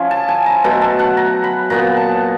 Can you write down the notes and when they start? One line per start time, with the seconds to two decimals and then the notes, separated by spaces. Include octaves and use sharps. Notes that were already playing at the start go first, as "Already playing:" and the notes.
Already playing: F3 C#4 E4
0.11 A5
0.28 G#5
0.46 A#5
0.64 B2 F#3 A3 A#5
0.82 A5
0.99 F#5
1.17 A#5
1.44 B5
1.70 A#2 F#3 B3 A#5
1.97 A5